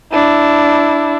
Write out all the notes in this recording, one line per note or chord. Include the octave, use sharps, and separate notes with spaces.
D4 E4